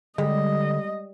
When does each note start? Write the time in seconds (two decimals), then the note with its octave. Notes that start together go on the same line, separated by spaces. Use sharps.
0.18 D3 G3 G#3 D#5